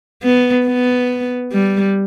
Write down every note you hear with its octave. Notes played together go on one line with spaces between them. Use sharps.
B3
B3
G3